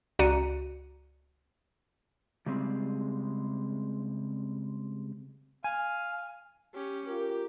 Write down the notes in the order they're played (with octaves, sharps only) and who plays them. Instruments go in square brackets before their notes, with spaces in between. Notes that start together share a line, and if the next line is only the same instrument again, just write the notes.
[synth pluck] C#2 F#4 D5 A#5 C#7 D#7
[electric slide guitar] C#3 G3 G#3 C4
[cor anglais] F5 [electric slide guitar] G#5
[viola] C#4 G4
[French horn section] F4 A#4 [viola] G4